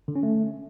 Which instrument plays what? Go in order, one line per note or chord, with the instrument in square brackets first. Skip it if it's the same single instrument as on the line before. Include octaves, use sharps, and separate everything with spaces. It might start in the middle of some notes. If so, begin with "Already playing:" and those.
[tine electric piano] D3
C#4
A3